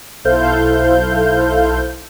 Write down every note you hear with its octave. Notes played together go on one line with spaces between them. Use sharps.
B1 E4 A4 C5 F5 G6